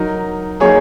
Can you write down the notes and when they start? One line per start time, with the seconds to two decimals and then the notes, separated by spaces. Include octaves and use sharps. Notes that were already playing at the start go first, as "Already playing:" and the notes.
Already playing: F#3 D#4 A#4
0.60 F#3 A#3 D#4 G#4 C#5